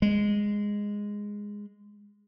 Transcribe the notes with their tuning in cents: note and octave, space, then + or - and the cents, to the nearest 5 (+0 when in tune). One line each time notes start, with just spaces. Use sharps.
G#3 -10